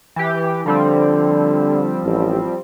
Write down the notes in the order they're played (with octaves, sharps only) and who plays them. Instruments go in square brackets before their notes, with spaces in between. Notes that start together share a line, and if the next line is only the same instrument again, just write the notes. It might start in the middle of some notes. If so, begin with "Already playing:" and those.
[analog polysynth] E3 G4
[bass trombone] D3 [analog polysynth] F3 G3 C4
[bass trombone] A1